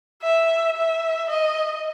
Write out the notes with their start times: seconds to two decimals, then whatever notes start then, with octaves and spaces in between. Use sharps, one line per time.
0.23 E5
0.77 E5
1.30 D#5